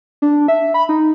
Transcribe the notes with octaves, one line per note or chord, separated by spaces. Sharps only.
D4
E5
B5
D#4